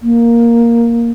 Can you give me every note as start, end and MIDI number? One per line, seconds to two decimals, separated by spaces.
0.01 1.11 58